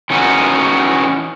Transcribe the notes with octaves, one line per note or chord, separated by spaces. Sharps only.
E3 C#4 D#4 F#4